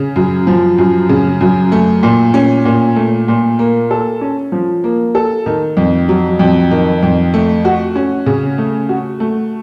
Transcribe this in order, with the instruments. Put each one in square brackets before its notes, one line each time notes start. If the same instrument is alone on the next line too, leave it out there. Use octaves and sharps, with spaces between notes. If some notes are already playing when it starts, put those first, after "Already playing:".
Already playing: [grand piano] C#3
F#2
F3
F#2
C#3
F#2
A3
A#2
C#4
A#2
A3
A#2
A#3
A4
C#4
F3
A#3
A4
D#3
F2
F#3
F2
D#3
F2
A3
F#4
C#4
C#3
A3
F#4
A3